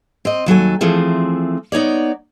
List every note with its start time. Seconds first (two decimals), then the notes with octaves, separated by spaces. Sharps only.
0.25 C4 D#5
0.46 D#2 F#3 A4 G#5
0.81 E3 F3 A3 C4 G#4
1.72 B3 D#4 C#5 D5